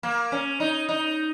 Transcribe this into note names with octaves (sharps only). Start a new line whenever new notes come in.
A#3
C#4
D#4
D#4